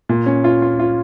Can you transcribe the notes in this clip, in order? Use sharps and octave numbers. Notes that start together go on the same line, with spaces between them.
A#2
C#4
F4
F4
F4